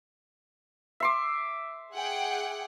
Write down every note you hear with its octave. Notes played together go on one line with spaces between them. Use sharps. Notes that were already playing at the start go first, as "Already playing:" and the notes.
E5 C6 D6
G#4 F#5 G5